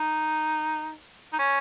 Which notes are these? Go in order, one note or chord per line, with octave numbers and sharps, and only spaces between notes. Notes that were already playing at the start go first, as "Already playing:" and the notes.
Already playing: D#4
D#4
C#4